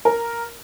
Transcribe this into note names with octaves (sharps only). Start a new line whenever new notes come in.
A#4